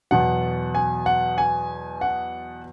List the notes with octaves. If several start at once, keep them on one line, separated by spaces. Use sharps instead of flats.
E2 B2 F#3 F#5
G#5
F#5
G#5
F#5